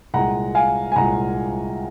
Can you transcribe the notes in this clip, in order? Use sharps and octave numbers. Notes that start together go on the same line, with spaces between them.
C2 A#2 G#3 F#5 A#5
F5 G#5
G#5
C2 A#2 G#3 F#5 A#5